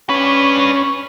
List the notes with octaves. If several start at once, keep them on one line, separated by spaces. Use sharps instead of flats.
C#4 D4 B4